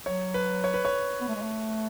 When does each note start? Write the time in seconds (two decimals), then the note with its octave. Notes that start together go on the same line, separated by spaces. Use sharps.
0.06 F#3 C#5
0.34 B4
0.64 C#5
0.74 B4
0.85 C#5
1.21 B3
1.28 A3
1.35 G#3
1.43 A3